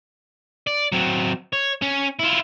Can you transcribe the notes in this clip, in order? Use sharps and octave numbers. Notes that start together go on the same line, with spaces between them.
D5
F#3 C4
C#5
C#4
E4 F4